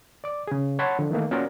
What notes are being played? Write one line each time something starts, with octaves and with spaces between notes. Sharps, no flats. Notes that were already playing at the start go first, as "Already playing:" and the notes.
D5 D6
C#3 G#4
C#5 F#5 A5 B5 C6
D3 F3
D#3 E3 A3 A#3
A#3 C#4 F4 F#4 A#4 D5